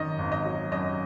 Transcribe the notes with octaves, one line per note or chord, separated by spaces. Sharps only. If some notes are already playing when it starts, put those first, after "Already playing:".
Already playing: G#1 F#2 D#3 F#3 D#5
G#1
D#5
F#3
F#2 D#5